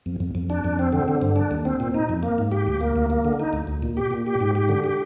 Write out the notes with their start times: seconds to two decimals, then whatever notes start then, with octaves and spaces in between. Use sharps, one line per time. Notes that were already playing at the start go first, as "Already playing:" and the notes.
0.06 F2
0.20 F2
0.35 F2
0.50 D4
0.64 F2
0.79 C4
0.92 D3
1.08 D3
1.22 G2
1.36 D4
1.51 D#2
1.65 C4
1.80 A#2
1.94 D#4
2.09 F2
2.23 A#3
2.38 G#2
2.52 G4
2.67 D2
2.81 A#3
2.96 D2
3.10 A#3
3.25 D3
3.40 D#4
3.53 D2
3.67 D2
3.82 A#2
3.97 G4
4.11 A#2
4.26 G4
4.41 G#2
4.55 G4
4.69 D3
4.84 G4